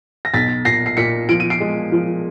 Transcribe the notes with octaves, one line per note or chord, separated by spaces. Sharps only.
A#6
B1 A6 B6
A#2 A#6 C7
C7
A#2 B6 C#7
F3 D7
D#7
C7 D7
G#3
F3